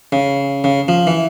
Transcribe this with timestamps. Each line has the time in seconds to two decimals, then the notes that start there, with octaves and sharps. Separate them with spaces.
0.12 C#3
0.64 C#3
0.88 F3
1.07 E3